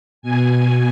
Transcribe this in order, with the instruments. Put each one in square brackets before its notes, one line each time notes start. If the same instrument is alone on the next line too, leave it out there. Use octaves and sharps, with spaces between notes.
[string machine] B2 G#5